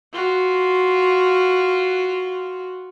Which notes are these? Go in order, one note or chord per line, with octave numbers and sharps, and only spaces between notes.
F4 F#4